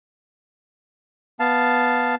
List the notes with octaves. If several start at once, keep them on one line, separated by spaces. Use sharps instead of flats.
B3 F5 A5